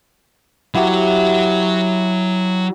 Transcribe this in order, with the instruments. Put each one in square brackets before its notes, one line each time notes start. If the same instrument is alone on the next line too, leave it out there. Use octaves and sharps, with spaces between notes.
[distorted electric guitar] F#3 [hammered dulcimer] E4 F#4 G4